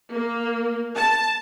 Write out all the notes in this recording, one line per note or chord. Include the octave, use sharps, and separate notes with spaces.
A#3
A5